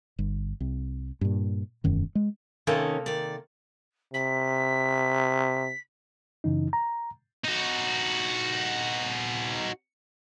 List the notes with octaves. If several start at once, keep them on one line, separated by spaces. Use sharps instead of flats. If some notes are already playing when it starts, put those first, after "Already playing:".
G1
C2
G2 A#2
E1 F#2 D#3
G#3
C3 D#3 A#3 C#4 D#4 A4
D#3 D5
C3 B6
F#2 C#3 E3 D#4
A#5
D#4 F#4